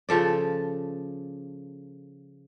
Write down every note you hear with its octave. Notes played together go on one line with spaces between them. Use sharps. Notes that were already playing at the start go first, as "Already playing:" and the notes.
C#3 F3 A4 D5